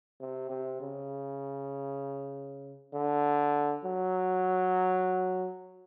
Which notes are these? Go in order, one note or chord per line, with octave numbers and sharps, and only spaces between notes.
C3
C3
C#3
D3
F#3